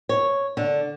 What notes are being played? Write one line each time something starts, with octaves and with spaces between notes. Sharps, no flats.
C#5
D3